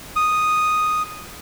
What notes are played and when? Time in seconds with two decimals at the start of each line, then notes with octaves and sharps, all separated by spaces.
0.16 D#6